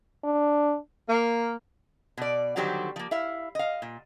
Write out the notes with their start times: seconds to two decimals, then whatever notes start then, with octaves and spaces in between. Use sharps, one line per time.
0.24 D4
1.07 A#3
2.17 B2 D5
2.56 D3 D#3 F#3 G3 G4 C5
2.96 F3 A#3
3.11 E4 E5 F5
3.55 D#5 F5
3.82 A#2